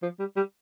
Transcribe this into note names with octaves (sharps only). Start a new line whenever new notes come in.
F3
G3
G3